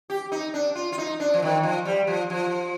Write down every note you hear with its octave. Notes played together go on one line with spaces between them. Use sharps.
G4
D#4
D4
F4
F4
D#4
D4
F3
D#3
F3
G3
F3
F3